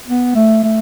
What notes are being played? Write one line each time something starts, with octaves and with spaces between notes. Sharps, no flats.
B3
A3
A3